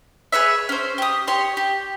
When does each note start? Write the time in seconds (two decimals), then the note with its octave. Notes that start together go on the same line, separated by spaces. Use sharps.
0.32 G#4 B4 C#5 E5
0.69 C#4 C5
0.98 G4 D#6
1.27 G4 C#5 C6
1.57 G4